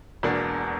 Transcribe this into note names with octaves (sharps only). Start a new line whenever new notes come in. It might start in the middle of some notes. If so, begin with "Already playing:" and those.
E1 E2 B2 A#3 D4